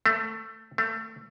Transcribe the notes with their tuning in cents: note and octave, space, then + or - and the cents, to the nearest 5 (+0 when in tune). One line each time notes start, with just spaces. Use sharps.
A3 +15
A3 +25